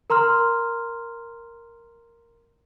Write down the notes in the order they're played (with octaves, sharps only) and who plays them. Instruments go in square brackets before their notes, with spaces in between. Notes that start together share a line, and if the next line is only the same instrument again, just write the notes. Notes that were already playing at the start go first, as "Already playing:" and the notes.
[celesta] A#4 A#5 C6 F6